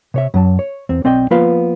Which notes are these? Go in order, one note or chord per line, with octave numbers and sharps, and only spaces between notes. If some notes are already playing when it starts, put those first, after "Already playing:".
C3 C#5 E5
F#2 F#3 A5
C#5
E2 C4
B1 C4 D5 D#5 G5
F3 A#3 B3 F4 B4 F5